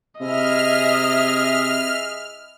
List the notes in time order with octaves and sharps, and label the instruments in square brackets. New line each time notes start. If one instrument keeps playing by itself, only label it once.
[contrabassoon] C3 [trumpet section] E4 G#4 E5 [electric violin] D#5 [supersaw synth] F6